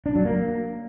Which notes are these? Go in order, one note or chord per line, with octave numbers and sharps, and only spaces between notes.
D4
F#3
A#3